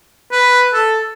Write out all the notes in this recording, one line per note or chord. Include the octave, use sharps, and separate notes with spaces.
B4
A4